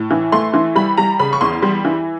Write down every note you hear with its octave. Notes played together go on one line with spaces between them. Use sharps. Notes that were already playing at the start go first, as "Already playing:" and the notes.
Already playing: A2
E3
A3 C6
E3
G3 B5
G3 A#5
C#3 B5
C#6
E2 C6
G3
E3